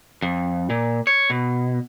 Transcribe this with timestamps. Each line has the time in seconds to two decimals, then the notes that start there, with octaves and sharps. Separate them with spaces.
0.22 F2
0.70 A#2
1.07 C#5
1.30 B2